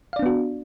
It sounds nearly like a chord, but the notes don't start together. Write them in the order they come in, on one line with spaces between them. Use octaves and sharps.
F5 D5 D4 B3 F#4